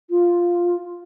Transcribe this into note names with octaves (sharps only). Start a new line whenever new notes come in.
F4